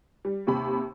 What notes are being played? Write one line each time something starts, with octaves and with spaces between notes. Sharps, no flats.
G3
D#2 C3 B5